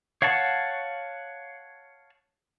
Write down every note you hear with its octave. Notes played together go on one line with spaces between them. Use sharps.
C#5 F5 F#5 A5 C#6